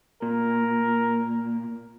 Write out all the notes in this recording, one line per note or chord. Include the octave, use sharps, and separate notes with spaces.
A#2 A#4